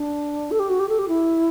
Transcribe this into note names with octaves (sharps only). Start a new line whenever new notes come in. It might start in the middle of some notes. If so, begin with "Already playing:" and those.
Already playing: D4
A4
G4
F#4
G4
A4
G4
E4